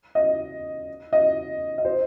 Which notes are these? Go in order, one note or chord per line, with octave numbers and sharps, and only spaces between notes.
D#5
D#5
D#5
C5